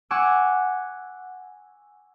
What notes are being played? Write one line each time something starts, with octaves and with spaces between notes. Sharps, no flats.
F#5 G#5 C#6 D6 E6 F#6